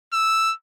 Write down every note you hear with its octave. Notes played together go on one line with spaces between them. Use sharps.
E6